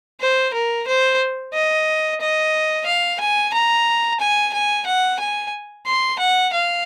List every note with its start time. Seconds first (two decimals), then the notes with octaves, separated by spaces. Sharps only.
0.21 C5
0.54 A#4
0.87 C5
1.54 D#5
2.21 D#5
2.86 F5
3.20 G#5
3.53 A#5
4.20 G#5
4.53 G#5
4.87 F#5
5.20 G#5
5.87 C6
6.19 F#5
6.53 F5